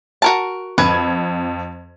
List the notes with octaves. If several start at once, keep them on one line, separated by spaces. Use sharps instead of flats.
F#4 A#4 A5
F2 B4 G#6